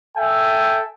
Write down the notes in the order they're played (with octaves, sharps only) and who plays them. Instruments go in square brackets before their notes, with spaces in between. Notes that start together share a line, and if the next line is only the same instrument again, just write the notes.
[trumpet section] A4 E5 G5 G#5